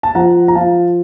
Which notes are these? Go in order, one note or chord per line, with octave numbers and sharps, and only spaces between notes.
A5
F3 F#5 A#5
A#5
F3 F5 A5